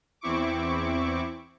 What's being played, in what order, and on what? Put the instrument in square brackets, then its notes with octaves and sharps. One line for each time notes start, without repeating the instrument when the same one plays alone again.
[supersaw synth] E2 C4 E4 C#6 D6